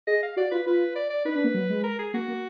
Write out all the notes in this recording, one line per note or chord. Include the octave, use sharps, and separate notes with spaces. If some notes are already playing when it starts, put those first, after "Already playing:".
G#4 D#5
F5
F#4 D5
F4 B4
F4 B4
D5
D5
D#4 B4
D4
A#3
F#3
G#3
A#4
G#4
A#3 F#4
A#3